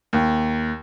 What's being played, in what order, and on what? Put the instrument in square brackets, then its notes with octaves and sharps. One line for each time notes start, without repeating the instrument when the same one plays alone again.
[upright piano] D#2